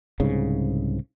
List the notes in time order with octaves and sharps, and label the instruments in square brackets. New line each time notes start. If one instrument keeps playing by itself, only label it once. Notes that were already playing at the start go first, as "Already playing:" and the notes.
[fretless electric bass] C2 G#2 C#3